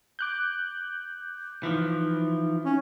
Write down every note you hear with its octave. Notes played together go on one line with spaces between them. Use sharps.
D6 F#6 G6
E3 F3 D#4
C#4 D#4